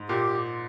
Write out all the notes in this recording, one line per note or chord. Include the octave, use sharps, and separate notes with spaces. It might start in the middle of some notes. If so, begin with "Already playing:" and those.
Already playing: G#2
A#2 G4